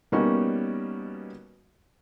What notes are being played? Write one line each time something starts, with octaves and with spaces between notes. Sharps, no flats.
B2 G3 A#3 C#4 D#4 F#4